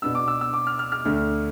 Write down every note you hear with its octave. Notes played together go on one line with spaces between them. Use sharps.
B2 B3 D4 E6
D6
E6
E6
D6
F6
F6
F6
D2 D3 A3